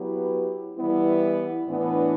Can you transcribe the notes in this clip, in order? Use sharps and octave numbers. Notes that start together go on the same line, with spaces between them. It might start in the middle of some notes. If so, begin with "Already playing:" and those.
Already playing: F#3 B3 E4 G4 B4
E3 G3 B3 E4
A2 E3 B3 D4